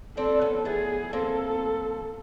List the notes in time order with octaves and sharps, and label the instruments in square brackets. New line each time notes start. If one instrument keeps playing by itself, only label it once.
[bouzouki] C4 D4 [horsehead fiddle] A4
[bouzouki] B3 C#4
[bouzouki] A3 B3 [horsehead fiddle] G#4
[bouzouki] A#3 C4 [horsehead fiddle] A4